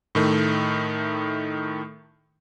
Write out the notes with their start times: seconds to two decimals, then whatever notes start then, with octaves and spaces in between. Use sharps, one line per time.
0.15 A2 D#3 A3